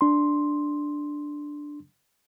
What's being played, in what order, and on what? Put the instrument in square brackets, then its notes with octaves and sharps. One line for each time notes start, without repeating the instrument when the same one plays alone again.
[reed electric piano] D4 C6